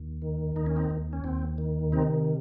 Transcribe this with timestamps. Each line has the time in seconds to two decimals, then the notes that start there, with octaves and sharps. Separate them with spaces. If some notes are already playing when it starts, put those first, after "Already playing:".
Already playing: D#2
0.22 D#3
0.56 D#2 D#4
0.66 C#4
0.76 C4 D#4
0.90 D#2
1.13 C#4
1.24 D#2 C4
1.58 D#3
1.92 C3 C4 D#4